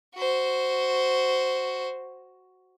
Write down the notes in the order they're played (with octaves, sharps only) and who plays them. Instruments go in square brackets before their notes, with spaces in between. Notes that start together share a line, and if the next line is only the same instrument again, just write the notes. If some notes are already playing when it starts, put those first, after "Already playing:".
[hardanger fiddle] F#4 C5